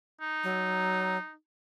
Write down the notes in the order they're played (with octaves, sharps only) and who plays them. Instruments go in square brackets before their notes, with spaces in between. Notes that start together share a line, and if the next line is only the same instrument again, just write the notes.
[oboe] D#4
[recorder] F#3